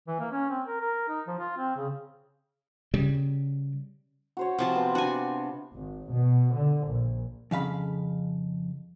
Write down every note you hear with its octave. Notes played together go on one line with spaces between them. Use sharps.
E3
A#3
C#4
C4
A#4
A#4
D#4
F3
F4
C4
C#3
C#3 G3
F#4 C5 C#5
C3 F3 F4 A5
B3 F4
D4 F#4 G#5
G#1
B2
D3
A#1
F2 C#3 F5 B5